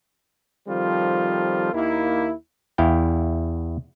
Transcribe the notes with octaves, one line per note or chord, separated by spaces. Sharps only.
D#3 F3 G3 C4 F4 A4
D#2 A#3 E4
E2 E4 F5 G5